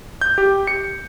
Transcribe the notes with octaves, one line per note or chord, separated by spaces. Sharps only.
G6
G4
C#7